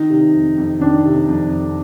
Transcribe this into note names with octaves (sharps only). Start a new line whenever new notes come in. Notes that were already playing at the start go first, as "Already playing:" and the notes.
Already playing: D#3 D#4
C3
F2
F2
D#3 D4
C3
F2
F2